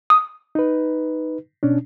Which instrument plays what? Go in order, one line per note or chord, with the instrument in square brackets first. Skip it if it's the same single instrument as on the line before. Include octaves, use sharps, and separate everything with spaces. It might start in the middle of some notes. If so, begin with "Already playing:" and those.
[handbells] D#6
[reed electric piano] D#4 B4
B2 C#4 D4